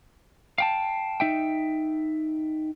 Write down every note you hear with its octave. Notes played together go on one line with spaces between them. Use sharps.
F5 G5 A5
D#4 E5 G5